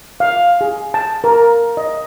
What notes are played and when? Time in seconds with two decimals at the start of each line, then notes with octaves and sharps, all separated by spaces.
0.20 F5
0.61 G#4
0.94 A5
1.24 A#4
1.77 D#5